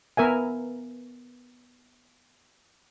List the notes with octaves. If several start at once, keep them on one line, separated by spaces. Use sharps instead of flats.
B3 A#4 E5 G#5